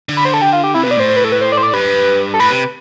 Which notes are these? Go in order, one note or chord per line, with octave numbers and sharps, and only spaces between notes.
D3
B5
C5
A4
G4
F4
G4
C3 E4
B4
B2 D5
A2 C5
C5
B4
A4
B4
C5
D5
C5
D5
G2 B4
A4
A2 B4
C3